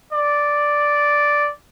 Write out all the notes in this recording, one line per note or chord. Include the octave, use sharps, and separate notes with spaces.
D5